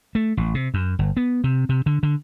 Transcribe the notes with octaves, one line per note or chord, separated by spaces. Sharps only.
A3
A1
C3
F#2
G1
B3
C3
C3
D3
D3